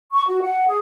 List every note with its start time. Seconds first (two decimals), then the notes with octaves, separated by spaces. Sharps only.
0.13 C#6
0.27 F#4
0.42 F#5
0.67 G#4